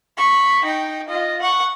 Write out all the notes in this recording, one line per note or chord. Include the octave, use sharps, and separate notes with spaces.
B5 C#6
D#4 G5
F4 D#5
F#5 C#6